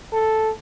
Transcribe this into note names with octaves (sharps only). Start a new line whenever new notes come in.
A4